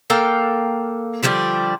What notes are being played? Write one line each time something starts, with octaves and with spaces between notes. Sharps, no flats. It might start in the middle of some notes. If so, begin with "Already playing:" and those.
A#3 A4 F5 G5
D3 F3 G3 D4